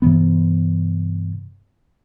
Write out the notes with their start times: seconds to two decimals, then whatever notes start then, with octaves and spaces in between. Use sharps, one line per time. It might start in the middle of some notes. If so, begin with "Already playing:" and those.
0.02 G2 C3 E3 B3